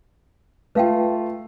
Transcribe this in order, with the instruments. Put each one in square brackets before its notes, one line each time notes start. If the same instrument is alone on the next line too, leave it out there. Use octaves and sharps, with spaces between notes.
[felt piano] A3 F4 [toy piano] B4 F5 G5